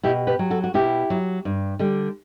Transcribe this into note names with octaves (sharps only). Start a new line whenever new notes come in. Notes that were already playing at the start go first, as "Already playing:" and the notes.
B2 E4 G4
G4 B4
F#3
F#4 A4
F#4
B2 E4 G4
F#3
G2
D3 G3